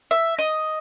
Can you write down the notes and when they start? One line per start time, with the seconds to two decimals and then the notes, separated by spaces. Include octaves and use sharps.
0.11 E5
0.39 D#5